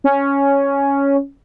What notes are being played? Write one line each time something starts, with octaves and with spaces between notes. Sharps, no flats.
C#4